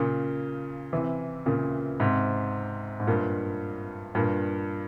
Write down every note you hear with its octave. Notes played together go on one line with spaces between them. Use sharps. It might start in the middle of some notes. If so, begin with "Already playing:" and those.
Already playing: A#2 C#3
C3 E3
A#2 C#3
G#2 C3
G#2
G2 A#2
G2 A#2